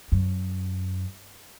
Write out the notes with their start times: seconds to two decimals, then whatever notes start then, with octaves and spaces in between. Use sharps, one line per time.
0.12 F#2